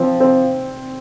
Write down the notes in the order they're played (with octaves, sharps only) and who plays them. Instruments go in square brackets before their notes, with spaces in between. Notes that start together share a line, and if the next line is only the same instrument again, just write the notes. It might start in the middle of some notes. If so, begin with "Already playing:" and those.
Already playing: [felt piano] F3 [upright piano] C4
[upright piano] C4